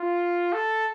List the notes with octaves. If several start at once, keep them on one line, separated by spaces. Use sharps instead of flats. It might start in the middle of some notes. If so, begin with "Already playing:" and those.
Already playing: F4
A4